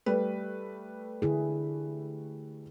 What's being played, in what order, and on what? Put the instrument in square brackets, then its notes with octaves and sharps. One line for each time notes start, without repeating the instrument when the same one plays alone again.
[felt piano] G3 A3 B4
[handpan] D3 E4 G#4